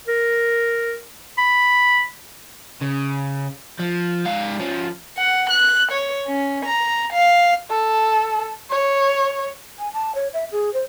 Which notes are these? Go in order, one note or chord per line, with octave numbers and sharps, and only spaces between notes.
A#4
B5
C#3
F3
G#2 F5
F3 C#4
F#5
F#6
C#5
C#4
A#5
F5
A4
C#5
G#5
A5
C#5
E5
G#4
C5